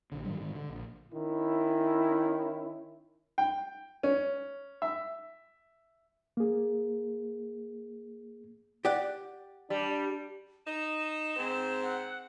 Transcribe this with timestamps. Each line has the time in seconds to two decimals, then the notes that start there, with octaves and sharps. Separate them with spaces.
0.12 A#1 D3
0.25 G#2 D#3 F#3 G3
0.40 G#2 D#3
0.55 D3
0.69 A#1
1.12 D#3 C#4 E4
3.38 G5
4.03 C#4
4.82 E5
6.37 A#3 G#4
8.85 G4 D5 F#5
9.70 G3 D4
10.66 D#4 E7
11.36 G#2 C4
11.82 F#5